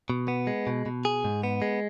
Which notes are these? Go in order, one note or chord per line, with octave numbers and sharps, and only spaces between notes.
B2
B3
G#3
B2
B2
G#4
G#2
B3
G#3